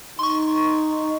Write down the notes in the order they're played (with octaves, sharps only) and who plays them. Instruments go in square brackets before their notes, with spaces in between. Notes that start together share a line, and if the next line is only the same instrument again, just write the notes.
[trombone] D#4 [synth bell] C6 C#6